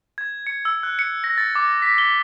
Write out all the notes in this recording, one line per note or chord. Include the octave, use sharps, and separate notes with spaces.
G#6
C#7
E6
F#6
C#7
A#6
A6
D6
B6
G7